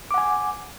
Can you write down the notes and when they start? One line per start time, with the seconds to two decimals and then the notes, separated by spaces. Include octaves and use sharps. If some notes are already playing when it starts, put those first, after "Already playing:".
0.11 D6
0.14 F#5
0.18 G#5